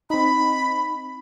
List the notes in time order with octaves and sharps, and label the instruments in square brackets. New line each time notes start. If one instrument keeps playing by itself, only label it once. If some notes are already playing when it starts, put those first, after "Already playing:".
[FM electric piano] C4 D#4 [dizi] B5